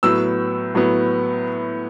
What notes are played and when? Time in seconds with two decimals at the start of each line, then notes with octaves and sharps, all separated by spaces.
0.03 A2 F#3 B3 E6
0.75 A2 F#3 B3